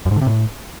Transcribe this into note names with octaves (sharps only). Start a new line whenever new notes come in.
F#2
G#2
D3
C3
A2